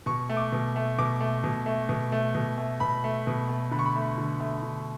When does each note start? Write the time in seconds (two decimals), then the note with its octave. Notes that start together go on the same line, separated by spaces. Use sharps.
0.06 B2 C#6
0.29 A3
0.37 D6
0.52 B2
0.76 A3
0.99 B2 D6
1.20 A3
1.44 B2
1.66 A3
1.89 B2
2.12 A3
2.35 B2
2.58 A3
2.80 B2 B5
3.04 A3
3.27 B2
3.49 A3
3.71 D3 B5
3.79 C#6
3.86 B5
3.95 A3
4.18 D3
4.40 A3
4.63 D3